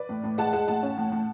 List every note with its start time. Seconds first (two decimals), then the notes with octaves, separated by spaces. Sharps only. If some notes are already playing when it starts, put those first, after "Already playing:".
Already playing: B4 D5
0.09 A2
0.24 A2
0.38 G#3 F#5 A5
0.53 G#3 F#5 A5
0.68 A2 F#5 A5
0.83 C#4
0.98 A2
1.12 A2